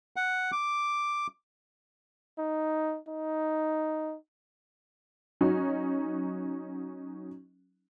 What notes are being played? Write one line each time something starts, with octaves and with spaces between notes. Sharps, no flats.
F#5
D6
D#4
D#4
F#3 C#4 D#4 F#4